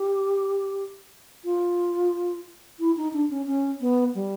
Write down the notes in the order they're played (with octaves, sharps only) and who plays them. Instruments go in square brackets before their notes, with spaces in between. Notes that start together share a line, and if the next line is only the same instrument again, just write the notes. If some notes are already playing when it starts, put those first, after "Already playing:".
Already playing: [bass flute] G4
F4
E4
D#4
D4
C#4
C#4
B3
G3